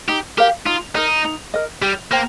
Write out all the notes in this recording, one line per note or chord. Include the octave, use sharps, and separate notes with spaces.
D#4 G4
G4 A#4 F5
D#4 F4
D#4 A#4 D#5
D#4
A#4 D#5
G3 G4
A#3 C5 G5